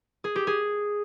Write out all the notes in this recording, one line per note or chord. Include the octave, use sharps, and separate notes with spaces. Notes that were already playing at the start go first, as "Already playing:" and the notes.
G#4
G4
G#4